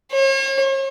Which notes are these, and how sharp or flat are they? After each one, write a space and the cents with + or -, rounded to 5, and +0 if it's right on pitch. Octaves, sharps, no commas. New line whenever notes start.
C#5 -45